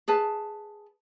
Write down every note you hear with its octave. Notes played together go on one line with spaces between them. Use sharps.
G#4 B4 A5